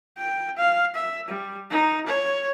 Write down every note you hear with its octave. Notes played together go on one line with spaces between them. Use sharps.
G5
F5
E5
G3
D#4
C#5